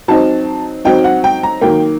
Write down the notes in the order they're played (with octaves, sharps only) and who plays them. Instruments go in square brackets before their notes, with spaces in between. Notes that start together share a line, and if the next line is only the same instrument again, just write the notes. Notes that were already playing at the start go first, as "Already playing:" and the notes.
[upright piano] F#3 C4 D#4 A5
F#3 C4 D#4 G5
F#5
G5
A#5
D#3 F#3 A#3 G5